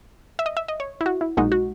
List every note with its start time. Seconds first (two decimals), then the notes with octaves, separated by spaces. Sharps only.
0.39 E5
0.46 D#5
0.57 E5
0.68 D#5
0.80 C#5
1.01 E4
1.06 F#4
1.21 E4
1.37 B1 A#2 G#3 D#4 F#4
1.52 F#4